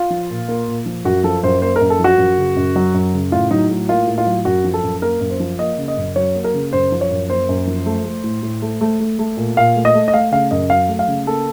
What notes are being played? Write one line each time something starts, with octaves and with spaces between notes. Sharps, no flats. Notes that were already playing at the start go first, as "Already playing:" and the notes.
Already playing: F4
F3
A#2
A#3
A#2
F3
F#2 F#4
F3 A4
F#2 C5
A#3 C5
A#4
F#2
A4
F3 F#4
F#2
C#3
F#2
F#3
F#2
C#3
A2 F4
F#3 D#4
A2
A#3 F4
A2
F4
F#3
F#2 F#4
F3
A4
F#2
A#3 A#4
F#2
C5
F3
A#3 D#5
C#3
D#5
F#2
F#3 C#5
A#3
A#4
C#3
F#2 C5
F3
C#5
F#2
A#3 C5
F#2
F3
A3
A3
A2
A2
A3
A3
A3
A3
A#2
A#2 F5
A3
D#5
A3
D#5
A3 F5
C#3 F5
F#2 D#5
F#3 F5
A3
F5
C#3
A#3 A4